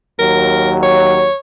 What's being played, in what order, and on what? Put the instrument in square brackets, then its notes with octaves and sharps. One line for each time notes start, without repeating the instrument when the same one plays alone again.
[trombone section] D#2 F#3 [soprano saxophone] A#4
[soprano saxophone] C#5